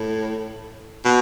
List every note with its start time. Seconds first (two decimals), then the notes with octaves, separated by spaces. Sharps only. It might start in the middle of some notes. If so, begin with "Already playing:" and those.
Already playing: A2
1.05 B2